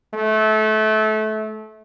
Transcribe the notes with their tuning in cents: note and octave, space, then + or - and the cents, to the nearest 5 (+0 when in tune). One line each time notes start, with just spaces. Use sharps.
A3 -25